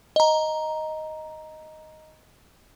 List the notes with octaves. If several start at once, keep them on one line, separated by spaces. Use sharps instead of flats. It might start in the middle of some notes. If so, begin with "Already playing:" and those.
D#5 A#5